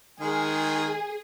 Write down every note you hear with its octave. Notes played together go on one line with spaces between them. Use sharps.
D#3 G#3 G#4